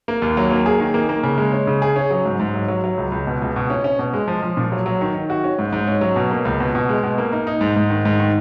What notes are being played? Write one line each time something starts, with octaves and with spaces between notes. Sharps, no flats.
A#3
D#2
F#3
A#3
G#4
D#3
A#3
A#3
C#3
G#3
C#4
C#3
G#4
C#4
F#3
G#2
G#2
F#3
F#3
F#3
C#2
C#2
B2
C#2
B2
C#4
C#4
B2
G#3
F3
F3
A#2
F#3
F#3
D#3
D#3
F#4
C#4
G#2
G#2
C#4
F#3
B2
A#3
C#2
B2
B2
G#3
B2
A#3
D#4
D#4
G#2
G#2
D#3
G#2
D#3